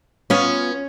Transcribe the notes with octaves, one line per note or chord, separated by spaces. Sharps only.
B3 C#4 F4 C#5